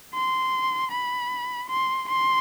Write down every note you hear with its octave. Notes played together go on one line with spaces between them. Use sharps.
C6
B5
C6
C6